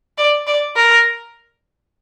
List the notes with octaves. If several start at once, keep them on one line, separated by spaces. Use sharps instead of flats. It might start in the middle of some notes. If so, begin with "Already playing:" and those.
D5
D5
A#4